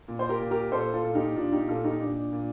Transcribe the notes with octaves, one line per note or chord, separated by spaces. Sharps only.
A#2
C5
G4 A#4
A#2
G4 A#4
A#2 A4 C5
F4 A4
A#2
D#4 G4
A#2 D4 F4
D#4 G4
A#2 F4 A4
D#4 G4
A#2 D4
A#2